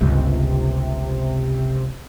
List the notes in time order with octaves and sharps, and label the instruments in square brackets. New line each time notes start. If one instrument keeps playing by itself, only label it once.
[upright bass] G1 C#2 [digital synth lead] C3